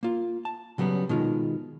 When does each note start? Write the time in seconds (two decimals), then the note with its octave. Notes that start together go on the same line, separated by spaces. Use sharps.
0.03 A#3 F4
0.45 A5
0.78 C#3 F#3 G3 B3 C#4
1.09 B2 D#3 G#3 F4